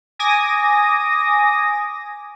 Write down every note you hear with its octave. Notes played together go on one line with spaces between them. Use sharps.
G#5 D6 D#6 A#6